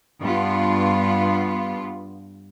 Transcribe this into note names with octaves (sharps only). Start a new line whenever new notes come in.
G2 B3 F4